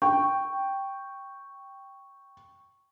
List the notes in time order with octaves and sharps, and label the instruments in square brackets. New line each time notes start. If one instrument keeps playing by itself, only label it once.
[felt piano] G5 [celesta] C#6